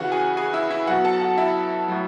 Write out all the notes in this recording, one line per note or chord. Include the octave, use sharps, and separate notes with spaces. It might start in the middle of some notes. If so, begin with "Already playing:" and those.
Already playing: C#3 E3 F#4 F#5
G#4 G#5
G#4 G#5
E4 E5
E4 E5
B2 F#3 F#4 F#5
A4 A5
F#4 F#5
E4 E5
A2 F#3